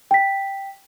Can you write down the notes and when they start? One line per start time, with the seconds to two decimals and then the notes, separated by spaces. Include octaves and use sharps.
0.11 G5 B6